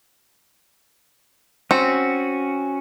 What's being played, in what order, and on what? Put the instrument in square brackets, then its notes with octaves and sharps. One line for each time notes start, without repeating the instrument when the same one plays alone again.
[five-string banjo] C4 [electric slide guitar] C#4 F#4